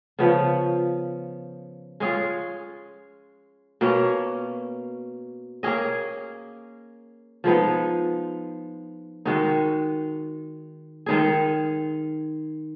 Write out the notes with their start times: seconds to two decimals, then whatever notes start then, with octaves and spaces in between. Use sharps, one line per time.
0.19 C#3 F3 B3
2.00 G#3 C#4 F4 G#4
3.81 B2 A#3 C#4
5.63 A#3 C#4 G#4 D#5
7.44 F3 G#3 B3 D#4
9.25 D#3 G#3 D#4 F#4
11.06 D#3 G#3 D#4 G#4